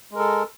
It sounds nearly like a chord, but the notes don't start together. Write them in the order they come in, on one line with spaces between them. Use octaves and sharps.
G#3 A#4 A4